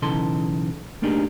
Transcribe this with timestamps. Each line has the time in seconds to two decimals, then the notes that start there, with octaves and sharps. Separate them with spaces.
0.02 B1 C#3 E3 D#4 A4 C6
1.02 A3 A#3 D4 D#4 G4 G#4